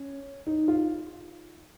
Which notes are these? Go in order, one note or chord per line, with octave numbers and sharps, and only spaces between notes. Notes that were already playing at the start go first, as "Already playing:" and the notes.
Already playing: C#4
D#4
F4